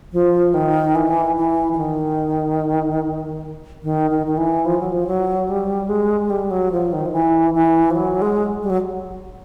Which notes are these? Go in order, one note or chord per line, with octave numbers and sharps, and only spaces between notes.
F3
D#3
E3
E3
E3
D#3
D#3
D#3
D#3
E3
F3
F#3
F3
F#3
G3
G#3
G3
F#3
F3
D#3
F3
E3
E3
F3
F#3
G#3
G3
F#3